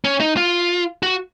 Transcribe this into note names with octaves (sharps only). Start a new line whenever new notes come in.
C#4
D#4
F4
F#4